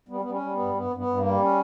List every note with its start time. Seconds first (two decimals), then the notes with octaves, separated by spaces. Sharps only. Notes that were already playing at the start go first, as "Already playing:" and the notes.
0.08 G3 B3
0.20 G3 B3
0.30 C#4
0.41 G3
0.52 B3
0.57 G2
0.74 G2 B3
0.90 G2
0.96 B3
1.06 G2
1.17 A#3
1.23 G3
1.39 C#4